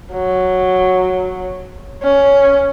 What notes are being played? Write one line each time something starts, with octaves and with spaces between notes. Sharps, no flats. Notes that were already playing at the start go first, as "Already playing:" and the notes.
F#3
C#4